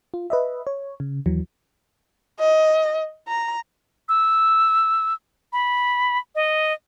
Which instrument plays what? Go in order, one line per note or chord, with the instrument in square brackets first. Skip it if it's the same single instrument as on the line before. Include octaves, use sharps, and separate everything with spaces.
[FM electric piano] F4
B4 D#5 E5
C#5
C#3
D#2 E3 F#3
[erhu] D#5
A#5
[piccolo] E6
B5
D#5